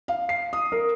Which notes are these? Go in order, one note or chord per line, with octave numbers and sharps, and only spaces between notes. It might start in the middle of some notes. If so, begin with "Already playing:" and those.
F5
C7
D#6
A#4